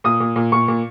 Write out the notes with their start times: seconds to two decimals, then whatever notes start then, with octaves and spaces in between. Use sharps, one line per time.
0.04 A#2 D#6
0.20 A#2
0.36 A#2
0.52 A#2 C#6
0.68 A#2